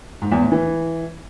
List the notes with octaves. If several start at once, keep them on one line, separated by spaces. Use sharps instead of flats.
G#2
E2
A2
E3